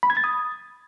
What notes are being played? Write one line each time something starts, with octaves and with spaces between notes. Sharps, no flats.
B5
G#6
A6
D#6